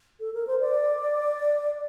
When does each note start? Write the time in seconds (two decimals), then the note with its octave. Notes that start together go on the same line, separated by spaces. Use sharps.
0.20 A4
0.34 A#4
0.47 C5
0.60 D5